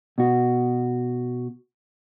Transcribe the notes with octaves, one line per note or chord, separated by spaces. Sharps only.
B2 F#4